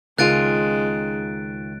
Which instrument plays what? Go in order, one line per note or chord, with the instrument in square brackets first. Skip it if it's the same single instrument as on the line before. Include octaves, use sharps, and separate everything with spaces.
[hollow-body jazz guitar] C#2 [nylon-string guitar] D#3 F4 [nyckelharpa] G#3 [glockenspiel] F#6 A6 D7